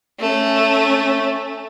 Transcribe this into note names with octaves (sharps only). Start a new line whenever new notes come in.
A3 C#4